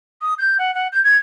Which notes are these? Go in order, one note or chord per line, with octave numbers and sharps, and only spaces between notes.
D#6
G6
F#5
F#5
G6
G#6